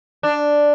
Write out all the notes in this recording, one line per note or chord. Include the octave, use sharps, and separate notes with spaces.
D4